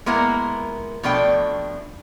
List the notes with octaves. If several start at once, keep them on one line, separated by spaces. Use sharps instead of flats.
G#3 A#3 B3 E4 A#4
B2 F3 A3 D4 G5